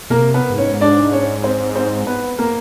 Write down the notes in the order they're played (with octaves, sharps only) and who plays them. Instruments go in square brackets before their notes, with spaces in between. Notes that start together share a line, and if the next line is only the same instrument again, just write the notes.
[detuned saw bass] B2 [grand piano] A#3 A#4
[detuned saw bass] C3
[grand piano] B3 B4
[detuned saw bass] G#2
[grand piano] C#4 C#5
D4 D5
C#4 C#5
C4 C5
C4 C5
B3 B4
A#3 A#4